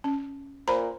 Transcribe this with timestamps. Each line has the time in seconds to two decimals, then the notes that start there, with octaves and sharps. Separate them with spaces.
0.04 C#4
0.68 A#2 C5 A#5 B5